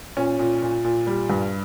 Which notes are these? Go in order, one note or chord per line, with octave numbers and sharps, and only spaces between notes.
A#2 C#4
A#2
A#2
A#2
G3
G2